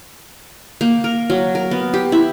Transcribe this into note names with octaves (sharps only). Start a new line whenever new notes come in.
A#3
A#4
F#3
A#4
B3
G4
E4